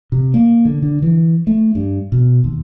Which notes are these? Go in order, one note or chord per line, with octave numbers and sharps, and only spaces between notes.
C3
A#3
D3
D3
E3
A3
G2
B2
D#2